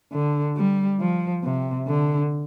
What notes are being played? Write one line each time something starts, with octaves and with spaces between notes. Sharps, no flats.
D3
G3
F3
C3
D3